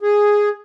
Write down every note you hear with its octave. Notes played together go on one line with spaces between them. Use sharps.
G#4